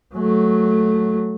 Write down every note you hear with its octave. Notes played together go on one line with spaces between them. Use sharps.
F#3 A3